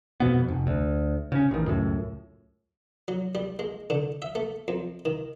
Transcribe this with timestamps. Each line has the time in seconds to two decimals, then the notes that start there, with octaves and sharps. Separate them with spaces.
0.20 F2 B2 B3
0.48 F1
0.67 D2
1.32 C#3 C#4
1.51 A1 D#3
1.66 C#2 F#2 A2
3.08 F#3
3.35 G3
3.59 G#3
3.90 D3
4.22 E5
4.35 A3
4.68 F2
5.05 D#3